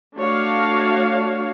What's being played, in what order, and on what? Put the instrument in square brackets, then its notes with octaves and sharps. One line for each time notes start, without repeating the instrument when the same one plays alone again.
[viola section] A3 D4 F#4 C#5 F5